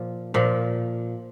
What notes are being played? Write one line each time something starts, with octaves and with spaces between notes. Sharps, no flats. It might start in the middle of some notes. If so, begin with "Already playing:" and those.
Already playing: A#2 F3
A#2 F3